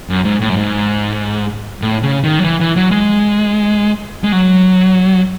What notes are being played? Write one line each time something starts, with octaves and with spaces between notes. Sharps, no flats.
F#2
G#2
A2
F#2
G#2
A2
C#3
D#3
F#3
E3
E3
F#3
G#3
G#3
F#3